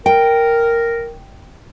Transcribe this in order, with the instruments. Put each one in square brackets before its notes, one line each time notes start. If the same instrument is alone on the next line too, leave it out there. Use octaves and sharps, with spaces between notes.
[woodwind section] A#4 [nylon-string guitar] G5